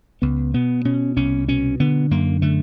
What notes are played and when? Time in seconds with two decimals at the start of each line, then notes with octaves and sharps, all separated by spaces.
0.22 C#2 B3
0.54 B2 B3
0.85 B2 C#4
1.16 C2 C#4
1.48 B2 C#4
1.80 D3 B3
2.11 F#2 A#3
2.42 D3 A3